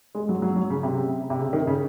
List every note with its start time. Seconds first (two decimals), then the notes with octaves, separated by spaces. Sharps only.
0.15 G#3
0.29 F#3
0.42 F#3
0.56 F#3
0.70 C#3
0.83 C3
1.30 C3
1.39 C#3
1.53 D#3
1.67 C#3